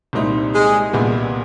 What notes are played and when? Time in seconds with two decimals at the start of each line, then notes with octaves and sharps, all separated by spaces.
0.13 C2 A#2 G3 C4 D#4
0.54 G#3
0.93 C2 A#2 G3 B3